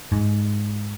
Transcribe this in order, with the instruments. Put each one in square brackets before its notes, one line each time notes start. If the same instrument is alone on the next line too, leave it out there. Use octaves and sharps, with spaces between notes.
[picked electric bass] G#2